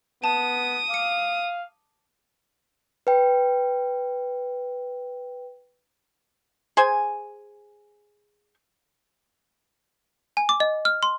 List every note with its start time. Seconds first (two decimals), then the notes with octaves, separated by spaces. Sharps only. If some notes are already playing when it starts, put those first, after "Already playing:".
0.24 B3 A5 D#6
0.90 F5 D6 C#7
3.07 B4 G5
6.77 G#4 C5 G#5
10.37 G#5
10.49 D6
10.60 D#5
10.85 F6
11.03 C6